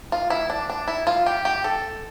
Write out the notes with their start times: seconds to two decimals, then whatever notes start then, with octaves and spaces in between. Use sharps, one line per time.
0.12 F4
0.30 E4
0.50 D4
0.70 D4
0.88 E4
1.07 F4
1.26 G4
1.45 G4
1.64 A4